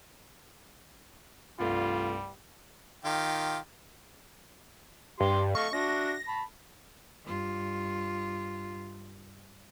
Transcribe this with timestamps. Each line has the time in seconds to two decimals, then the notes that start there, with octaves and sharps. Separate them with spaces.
1.59 C2 G2 G3 A3 F4
3.05 D#3 F4 G4
5.20 G2 G4 C6
5.55 A3 D#5 F5 C#6
5.73 D4 F#4 E5 A#6
6.28 A5 B5
7.25 G2 F4